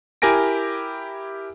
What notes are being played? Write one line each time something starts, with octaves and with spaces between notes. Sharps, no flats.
E4 G4 A#4 G#5 A#6 D7